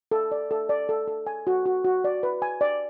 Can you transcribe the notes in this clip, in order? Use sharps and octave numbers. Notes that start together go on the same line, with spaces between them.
A4
D5
A4
D5
A4
A4
G#5
F#4
F#4
F#4
D5
B4
G#5
D5